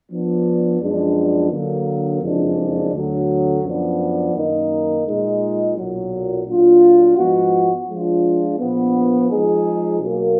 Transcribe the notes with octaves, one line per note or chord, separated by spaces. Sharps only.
F3 B3 D4
F#2 F3 G#3 B3 D4
D3 F#3 A#3
F#1 F2 F3 G#3 D4
D2 D3 F#3
F#2 F3 B3 D4
F#2 D#3 A#3 D#4
A#2 G#3 D#4
B1 A#2 F#3
A#2 F#3 D4 F4
G#2 F3 B3 D#4 F#4
F3 G#3 D4 F4
A#1 A#2 F3 B3
F3 G#3 D#4 G#4
B1 B2 F#3 A#3